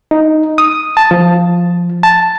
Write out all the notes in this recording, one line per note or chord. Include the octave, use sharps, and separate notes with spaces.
D#4
D#6
A5
F3
A5